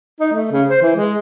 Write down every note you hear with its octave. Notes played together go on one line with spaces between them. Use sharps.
D#4
A3
C#3
C5
E3
G#3